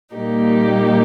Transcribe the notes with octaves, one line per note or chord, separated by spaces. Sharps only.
A#2 G3 A#3 D#4 G4